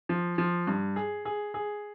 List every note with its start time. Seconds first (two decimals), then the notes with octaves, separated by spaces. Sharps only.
0.09 F3
0.38 F3
0.67 G2
0.96 G#4
1.25 G#4
1.54 G#4